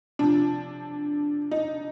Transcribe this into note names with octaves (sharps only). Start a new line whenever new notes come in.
C3 F3 D4
D#4